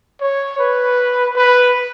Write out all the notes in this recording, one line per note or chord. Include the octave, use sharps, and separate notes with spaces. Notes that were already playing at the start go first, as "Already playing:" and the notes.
C#5
B4
B4